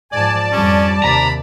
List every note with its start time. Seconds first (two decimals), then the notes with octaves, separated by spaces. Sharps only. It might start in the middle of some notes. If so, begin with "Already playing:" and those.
0.12 G#2 F3 D5 G#5 A5
0.52 F2 G3 C#4
1.04 D#2 C3 A#5 B5